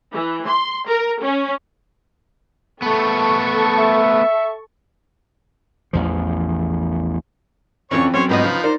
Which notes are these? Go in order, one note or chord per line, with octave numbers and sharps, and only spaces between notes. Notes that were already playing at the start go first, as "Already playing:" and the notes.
E3
C6
A#4
C#4
A3 B3 A4 C#6
E5
A1 E2 F3
F2 D3 E3 F3 C4 C#4 C#5 C#6
B1 F#2 C#4 C5 C#5
G#2 F3 B3 D#4 B4 D#5
C#3 F4
D#4 A#4 C5 D5